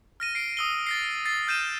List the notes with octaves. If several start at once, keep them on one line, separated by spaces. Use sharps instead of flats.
F6 A#6 D#7
C7 D7
D#6 E6 G7
A6 A#6 C7
A6 C7
F6 G6 D#7 E7